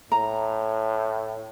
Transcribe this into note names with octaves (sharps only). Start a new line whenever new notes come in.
A2 A#5